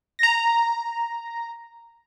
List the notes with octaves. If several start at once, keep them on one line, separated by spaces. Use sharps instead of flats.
A#5 A#6